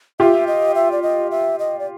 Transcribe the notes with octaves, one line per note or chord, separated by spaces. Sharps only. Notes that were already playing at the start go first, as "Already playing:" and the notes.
F4 G4 E5
D#5
E5
D5
D#5
E5
D#5
D5